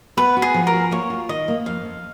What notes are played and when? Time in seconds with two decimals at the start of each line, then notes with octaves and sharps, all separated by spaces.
0.17 B3 B4
0.37 F#4
0.42 G#4
0.54 F3
0.67 A#4
0.74 F#4
0.91 A#3 C#5
1.10 F4
1.29 D#3 D#5
1.48 A#3
1.66 F2 F5
1.85 F2